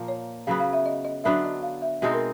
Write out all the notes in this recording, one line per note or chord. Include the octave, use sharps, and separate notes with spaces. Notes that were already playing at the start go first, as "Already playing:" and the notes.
Already playing: A#2 F3 A#3
C#5
C#3 F#3 B3 F5
F5
E5
D#5
D#5
D3 F#3 B3 D4 E5
D#5
F5
E5
B2 G#3 C4 D#4 E5
A#4